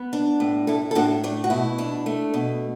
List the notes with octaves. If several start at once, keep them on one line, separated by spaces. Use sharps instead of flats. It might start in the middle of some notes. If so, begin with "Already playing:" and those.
Already playing: B3
D4
A2
A2 E4 A4
A4
A2 D4 F#4
A3 D4
F#4
B2 E4
D4
A3
B2